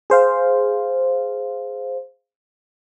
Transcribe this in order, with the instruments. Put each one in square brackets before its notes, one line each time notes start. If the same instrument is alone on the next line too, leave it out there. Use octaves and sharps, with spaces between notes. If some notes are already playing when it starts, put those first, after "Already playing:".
[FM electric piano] G#4 C5 F5